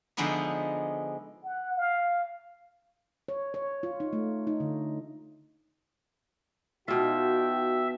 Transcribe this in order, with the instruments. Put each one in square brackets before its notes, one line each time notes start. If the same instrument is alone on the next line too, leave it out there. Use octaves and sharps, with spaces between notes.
[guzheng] D3 F3 G#3 B3 D#4 E5
[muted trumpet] F#5
F5
[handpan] C#5
C#5
F4
D#4
A3
D#4
D3
[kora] B2 F4 [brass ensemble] D#4 F#4 G5 [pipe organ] E5